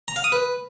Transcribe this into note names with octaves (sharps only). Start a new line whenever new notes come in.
A#5
F5
D#6
B4